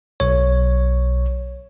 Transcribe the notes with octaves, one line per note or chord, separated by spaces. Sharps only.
B1 C#5